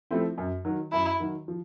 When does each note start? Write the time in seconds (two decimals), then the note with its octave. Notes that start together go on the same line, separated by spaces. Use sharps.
0.11 F3 A3 C4 E4
0.38 F#2
0.65 D#3 F#3
0.92 F#2 E4
1.20 D#3 F#3
1.48 F3